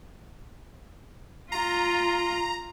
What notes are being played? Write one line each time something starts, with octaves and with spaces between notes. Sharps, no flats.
F4 A#5